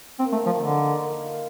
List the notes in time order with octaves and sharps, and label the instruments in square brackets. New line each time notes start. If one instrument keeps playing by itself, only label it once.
[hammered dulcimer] A#3 [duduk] C4
[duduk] A3
[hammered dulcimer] D#3
[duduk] F3
[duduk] D3 [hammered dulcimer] D#3
[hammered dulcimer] D#3
D#3
A#3
F4